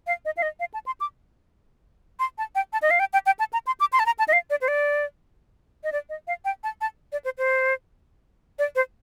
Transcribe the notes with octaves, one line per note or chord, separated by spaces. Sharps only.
F5
D#5
F5
D#5
F5
A5
C6
D6
C6
A5
G5
A5
D#5
F5
G5
G5
G5
A5
A#5
C6
D6
C6
A5
A#5
A5
D#5
F5
D5
C5
D5
D#5
D5
D#5
F5
G5
A5
A5
D5
C5
C5
D5
C5